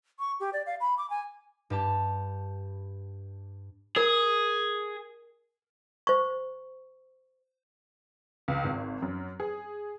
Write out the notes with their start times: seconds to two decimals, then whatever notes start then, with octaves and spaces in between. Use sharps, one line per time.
0.19 C#6
0.40 G4
0.53 D5
0.66 F5
0.80 B5
0.97 D6
1.10 G#5
1.70 G2 G4 A5
3.96 G#4 A#4
6.07 C5 C#6
8.48 C#2
8.64 G#1
9.02 F#2
9.40 G#4